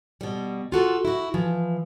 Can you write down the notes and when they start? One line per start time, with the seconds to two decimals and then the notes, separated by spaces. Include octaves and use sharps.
0.21 B2 G3
0.72 F4 F#4 A4
1.05 E4 F#4
1.34 E3 F3